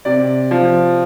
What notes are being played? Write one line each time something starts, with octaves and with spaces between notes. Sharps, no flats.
C3 D5
F3